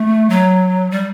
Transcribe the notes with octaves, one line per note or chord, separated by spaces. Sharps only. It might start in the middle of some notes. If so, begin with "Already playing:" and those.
Already playing: A3
F#3
G3